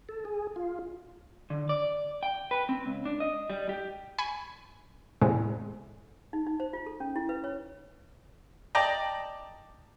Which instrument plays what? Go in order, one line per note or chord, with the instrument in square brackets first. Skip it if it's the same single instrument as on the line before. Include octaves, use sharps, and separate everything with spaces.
[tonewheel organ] A4
G#4
F4
[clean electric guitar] D3
D5
G5
B4
C4
C#2
D4
D#5
G3
G4
[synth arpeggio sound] G#5 B5 C#6
E2 A2 C3 G#3
[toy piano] D#4
D#4
C5
F4
A4
C#4
E4
B4
C#5
[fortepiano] D5 D#5 G5 A5 A#5